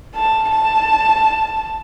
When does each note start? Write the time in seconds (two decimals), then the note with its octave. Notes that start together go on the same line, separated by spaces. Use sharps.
0.15 A5
0.51 A5